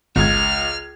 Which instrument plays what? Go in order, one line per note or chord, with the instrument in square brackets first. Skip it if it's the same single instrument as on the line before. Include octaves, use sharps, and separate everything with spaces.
[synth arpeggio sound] G#1 [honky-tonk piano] C#2 G#6 [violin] F6